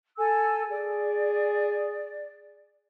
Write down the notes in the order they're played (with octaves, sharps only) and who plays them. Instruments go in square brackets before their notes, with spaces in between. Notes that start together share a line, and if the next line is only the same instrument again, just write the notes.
[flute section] A4 G#5 E6
[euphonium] G#4 [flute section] D5